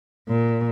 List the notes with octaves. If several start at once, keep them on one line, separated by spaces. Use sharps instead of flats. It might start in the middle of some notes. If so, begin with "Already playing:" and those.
A#2